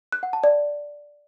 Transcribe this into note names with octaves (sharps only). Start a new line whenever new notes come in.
F#6
F#5
A5
D5